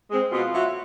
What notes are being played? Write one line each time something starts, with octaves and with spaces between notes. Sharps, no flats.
G#3 C4
B2 F4
F#3 A3